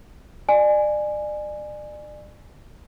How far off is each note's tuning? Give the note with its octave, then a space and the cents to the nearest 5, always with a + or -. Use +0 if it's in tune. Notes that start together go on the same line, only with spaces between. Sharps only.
D5 +35 G#5 +0